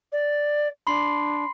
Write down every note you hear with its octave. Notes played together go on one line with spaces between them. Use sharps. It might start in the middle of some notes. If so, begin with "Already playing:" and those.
D5
D4 B5 C6 C7